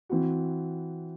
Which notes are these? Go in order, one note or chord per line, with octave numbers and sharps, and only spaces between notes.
E3 C4 F#4